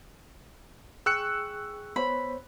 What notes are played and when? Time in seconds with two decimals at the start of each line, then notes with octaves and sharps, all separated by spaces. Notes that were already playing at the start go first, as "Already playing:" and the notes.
1.06 G#4 G5 C#6 E6 F#6 C#7
1.96 B3 C5 C#5 B5